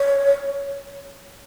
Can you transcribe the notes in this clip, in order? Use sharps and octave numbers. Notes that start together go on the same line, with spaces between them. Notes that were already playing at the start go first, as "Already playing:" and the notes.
Already playing: C#5